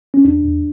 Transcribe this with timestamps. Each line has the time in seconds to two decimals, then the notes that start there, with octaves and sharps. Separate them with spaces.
0.14 C#4
0.25 E2 D4
0.44 E2